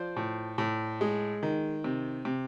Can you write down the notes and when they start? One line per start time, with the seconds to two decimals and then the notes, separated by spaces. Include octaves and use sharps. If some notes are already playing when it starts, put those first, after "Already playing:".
Already playing: F3 C5 D5
0.17 A2
0.58 A2
1.01 G#3
1.43 D#3
1.84 C3
2.25 C3